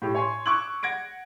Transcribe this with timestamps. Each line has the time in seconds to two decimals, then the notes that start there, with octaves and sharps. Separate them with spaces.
0.02 A2 G4
0.15 C#5 G#5 C6
0.46 C#6 D6 E6 F#6 G#6 F#7
0.83 F#5 G#6 A#6 D7